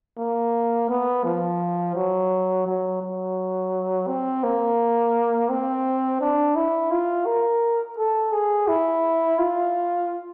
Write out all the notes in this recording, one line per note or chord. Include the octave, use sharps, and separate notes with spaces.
A#3
B3
F3
F#3
F#3
F#3
C4
A#3
C4
D4
E4
F4
A#4
A4
G#4
E4
F4